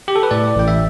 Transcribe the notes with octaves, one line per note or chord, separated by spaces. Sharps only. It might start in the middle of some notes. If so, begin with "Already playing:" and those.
G4
A4
B4
A2 D5
A1 G5
E5